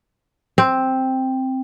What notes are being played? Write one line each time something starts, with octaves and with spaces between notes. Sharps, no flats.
C4